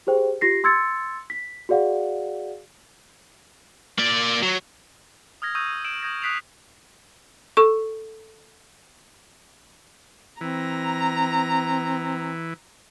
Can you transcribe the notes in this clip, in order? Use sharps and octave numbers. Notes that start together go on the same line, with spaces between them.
G4 G#4 C5 G5
F4 G4 A#6 C7
C6 E6 G#6 A6 C#7
B6
F#4 G#4 D5 F5 F#5
A#3 D5
F#3
D#6 F6 G#6 A#6
C#6 D#6 E6 G6 A#6 D#7
E6 D7 E7 F#7
D#6 G6 G#6 A#6
D#6 F#6 B6 C7 D7 F7
A4 C#6
E3 C4 A#5